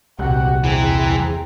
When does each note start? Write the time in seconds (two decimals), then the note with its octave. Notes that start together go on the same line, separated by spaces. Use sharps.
0.19 D#1 C2 F#4 G4 F#5
0.64 E2 E3 C4 G#4 A#5